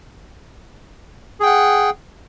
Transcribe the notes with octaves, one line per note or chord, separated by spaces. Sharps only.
G#4 F#5 G5